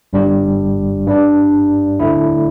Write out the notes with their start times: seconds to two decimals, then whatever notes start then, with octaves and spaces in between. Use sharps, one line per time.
0.13 G1 G2 G3 D4 G4
1.07 G2 G3 D4
2.00 D2 D3 A3 E4